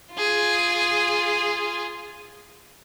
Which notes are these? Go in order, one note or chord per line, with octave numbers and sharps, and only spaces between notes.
F4 G#4